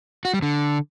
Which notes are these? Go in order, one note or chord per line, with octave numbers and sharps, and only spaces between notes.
F#4
G3
D3